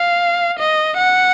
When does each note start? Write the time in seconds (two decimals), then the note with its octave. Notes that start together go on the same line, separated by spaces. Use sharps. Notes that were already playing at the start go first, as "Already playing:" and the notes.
Already playing: F5
0.59 D#5
0.98 F#5